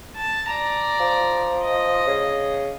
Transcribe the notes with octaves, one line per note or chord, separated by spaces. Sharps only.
A5
D5 A#5
F3
D#5
C#3